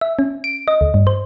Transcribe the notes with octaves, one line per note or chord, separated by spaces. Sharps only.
E5
C#4
D7
D#5
D2
G2
C5